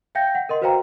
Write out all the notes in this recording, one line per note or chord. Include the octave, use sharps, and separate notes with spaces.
E5 F5 G5 G6 A#6
F#5
A#4 D#5 C6
F#4 B4 C5 F5 G5 A#5